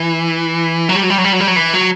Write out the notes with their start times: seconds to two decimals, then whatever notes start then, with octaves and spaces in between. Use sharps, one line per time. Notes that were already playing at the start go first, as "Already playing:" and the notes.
Already playing: E3
0.89 F#3
0.96 G3
1.03 F#3
1.10 G3
1.18 F#3
1.24 G3
1.33 F#3
1.40 G3
1.47 F#3
1.56 E3
1.74 F#3